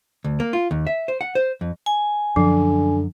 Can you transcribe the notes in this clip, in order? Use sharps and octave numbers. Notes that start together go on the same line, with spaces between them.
D2
A#3
F4
D#2
E5
C5
F#5
C5
F2
G#5
F#2 D3 F3